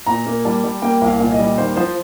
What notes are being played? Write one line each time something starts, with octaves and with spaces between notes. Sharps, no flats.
A#2 A#5
A#3
G3 A5
G3
A#3 G5
C2
F5
A#2
D#5
G3
D#2 C5
F3 C5